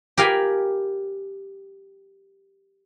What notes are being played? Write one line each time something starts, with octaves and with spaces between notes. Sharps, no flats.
G4 A#4 F5 G5 G#5 B5